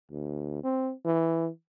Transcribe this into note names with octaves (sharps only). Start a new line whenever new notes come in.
D2
C4
E3